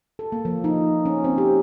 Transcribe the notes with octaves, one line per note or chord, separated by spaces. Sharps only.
A4
A#3
F3
D#4
C#4
C4
G4